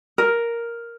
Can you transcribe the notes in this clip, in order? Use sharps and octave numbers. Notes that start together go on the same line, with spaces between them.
A#4